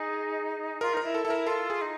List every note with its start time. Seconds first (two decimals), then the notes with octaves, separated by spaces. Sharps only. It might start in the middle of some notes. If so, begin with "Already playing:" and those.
Already playing: D#4 G#4
0.81 F4 A#4
0.93 D#4 A#4
1.03 E4
1.14 A4
1.25 E4 A4
1.30 A#4
1.47 F4 A4
1.70 G#4
1.80 D#4